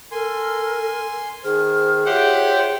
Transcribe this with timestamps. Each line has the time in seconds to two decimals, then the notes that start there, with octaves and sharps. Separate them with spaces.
0.12 A4 A#4 G#5 C6
1.45 D#3 G#4 C5 F6
2.06 F4 G4 C5 C#5 E5 F#5 G5